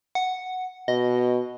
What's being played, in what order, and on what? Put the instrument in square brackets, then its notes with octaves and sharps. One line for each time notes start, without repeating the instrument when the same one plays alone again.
[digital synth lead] F#5
[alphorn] B2 [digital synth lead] D#5